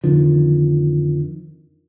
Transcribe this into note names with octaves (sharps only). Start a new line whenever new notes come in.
F2 D3 D#3 F3